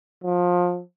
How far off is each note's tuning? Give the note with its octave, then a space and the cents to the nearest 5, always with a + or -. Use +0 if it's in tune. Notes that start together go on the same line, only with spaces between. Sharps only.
F3 +25